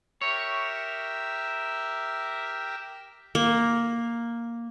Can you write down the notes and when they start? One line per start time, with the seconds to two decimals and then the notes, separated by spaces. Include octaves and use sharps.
0.21 G4 A#4 C#5 E5
3.35 A#3